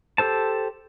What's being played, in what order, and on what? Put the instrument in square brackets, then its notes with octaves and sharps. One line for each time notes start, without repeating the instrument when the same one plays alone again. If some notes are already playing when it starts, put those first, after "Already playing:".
[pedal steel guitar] G4 A4 C5 A5